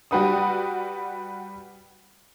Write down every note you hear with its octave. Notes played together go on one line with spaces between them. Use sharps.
G3 F#4 G4 B4 F#5 D#6